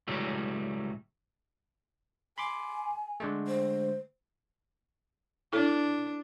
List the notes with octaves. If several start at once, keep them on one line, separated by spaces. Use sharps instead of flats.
C#2 A2 F#3 G3 A3
G#5 B5 C6 D6
D3 G#3 A3
C5
D4 E4 A4